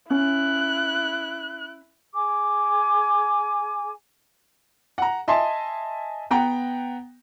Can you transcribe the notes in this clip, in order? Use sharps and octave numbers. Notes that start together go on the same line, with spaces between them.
C#4 E4 F#6
G#4 G#5 D6
F#5 A#5
D#5 E5 G#5 A5 C6
B3 F#5 G5 A#5